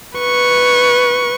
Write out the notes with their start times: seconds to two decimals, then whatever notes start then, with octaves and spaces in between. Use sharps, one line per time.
0.18 B4 C#6